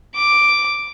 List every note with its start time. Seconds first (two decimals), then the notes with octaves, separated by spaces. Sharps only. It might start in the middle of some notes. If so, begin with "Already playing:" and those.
0.15 D6